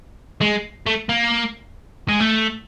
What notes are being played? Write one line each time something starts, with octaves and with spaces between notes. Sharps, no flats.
G#3
A3
A#3
G#3
A3